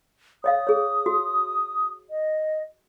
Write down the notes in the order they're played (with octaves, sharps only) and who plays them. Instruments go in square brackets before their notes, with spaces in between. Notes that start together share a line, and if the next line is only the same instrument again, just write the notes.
[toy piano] C#5 D#5 F5 [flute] D#6
[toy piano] G#4 C#5
F#4
[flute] D#5